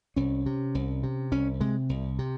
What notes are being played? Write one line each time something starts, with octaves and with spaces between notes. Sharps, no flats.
C2 C#4
C3
C2
C3
C2 C#4
C3 G#3
C2
C3